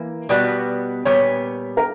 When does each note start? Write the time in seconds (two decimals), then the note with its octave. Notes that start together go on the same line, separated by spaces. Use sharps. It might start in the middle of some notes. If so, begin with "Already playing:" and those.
Already playing: E3 A#3
0.29 B2 G3 B3 F#4 D5
1.05 A#2 G3 B3 C#5
1.77 A#4